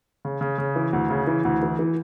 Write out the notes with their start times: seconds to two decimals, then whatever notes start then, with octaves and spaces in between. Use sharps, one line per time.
0.25 C#3
0.41 C#3
0.58 C#3
0.76 E3
0.93 D2
1.10 C#3
1.27 E3
1.45 D2
1.63 E3
1.79 E3